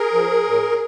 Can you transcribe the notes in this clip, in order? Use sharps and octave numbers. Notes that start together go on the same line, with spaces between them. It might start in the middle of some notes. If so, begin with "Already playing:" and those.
Already playing: G#4 A#4
F3
A2